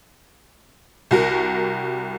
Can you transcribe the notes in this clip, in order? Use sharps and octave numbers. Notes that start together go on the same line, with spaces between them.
C2 F#4 A#4